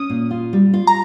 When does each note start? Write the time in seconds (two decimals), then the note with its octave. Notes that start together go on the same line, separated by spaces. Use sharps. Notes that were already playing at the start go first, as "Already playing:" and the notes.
Already playing: C#4 D#6
0.10 A#2
0.31 F4
0.53 G3
0.74 F4
0.87 A#5